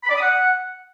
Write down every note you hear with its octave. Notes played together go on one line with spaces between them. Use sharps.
B5
D5
D#6
F#5